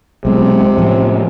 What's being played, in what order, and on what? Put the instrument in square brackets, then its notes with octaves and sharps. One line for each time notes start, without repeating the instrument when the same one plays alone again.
[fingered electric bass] B1 G#3 [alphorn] C3
[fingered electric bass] A2 F3 C#4